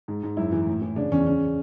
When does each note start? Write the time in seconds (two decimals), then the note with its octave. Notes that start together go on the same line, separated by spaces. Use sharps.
0.08 G#2
0.23 G#2
0.37 F#2 E4
0.52 E3
0.67 A2
0.82 E3
0.96 C#3 D4
1.12 E2 C#4
1.27 C#3 C#4